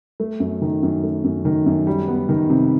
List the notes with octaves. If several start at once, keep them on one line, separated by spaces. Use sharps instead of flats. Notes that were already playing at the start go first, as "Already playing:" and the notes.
A3
F#2
D#3
F#2
A3
F#2
D#3
F#2
G3
B3
D#3
C3